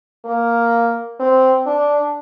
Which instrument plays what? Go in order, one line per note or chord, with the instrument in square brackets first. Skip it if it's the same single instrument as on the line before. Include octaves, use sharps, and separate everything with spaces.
[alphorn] A#3
C4
D4